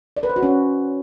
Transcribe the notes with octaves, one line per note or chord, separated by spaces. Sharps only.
D5
B4
C5
F#4
C#4